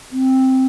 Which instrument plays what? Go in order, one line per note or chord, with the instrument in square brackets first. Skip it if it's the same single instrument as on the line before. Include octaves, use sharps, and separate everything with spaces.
[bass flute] C4